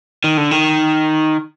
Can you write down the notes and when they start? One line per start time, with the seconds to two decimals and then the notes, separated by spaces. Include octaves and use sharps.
0.24 D#3
0.37 D3
0.51 D#3